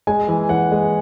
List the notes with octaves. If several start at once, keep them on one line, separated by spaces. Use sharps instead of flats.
G#3 G#5
E3
E3 F#5
G#3